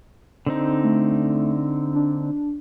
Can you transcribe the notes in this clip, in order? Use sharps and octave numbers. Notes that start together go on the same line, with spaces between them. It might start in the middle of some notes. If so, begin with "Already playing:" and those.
D3 C4 D#4
A3
D4